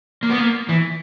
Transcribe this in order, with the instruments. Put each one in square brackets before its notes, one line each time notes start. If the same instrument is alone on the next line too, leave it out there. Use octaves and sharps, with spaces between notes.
[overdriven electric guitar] A#3
B3
A#3
E3